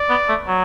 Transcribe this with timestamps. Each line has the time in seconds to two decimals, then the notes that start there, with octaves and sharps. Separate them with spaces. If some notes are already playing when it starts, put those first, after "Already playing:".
Already playing: D5
0.10 B3
0.29 A3
0.48 F#3